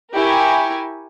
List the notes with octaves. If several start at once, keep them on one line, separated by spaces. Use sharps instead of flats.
E4 G4 A#4 G#5 C#6